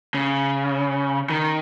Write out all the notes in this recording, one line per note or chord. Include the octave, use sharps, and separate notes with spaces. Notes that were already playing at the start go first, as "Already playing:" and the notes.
C#3
D#3